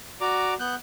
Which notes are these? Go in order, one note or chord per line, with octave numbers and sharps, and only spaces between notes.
F#4 D5 A#5 D6
B3 F#6 G6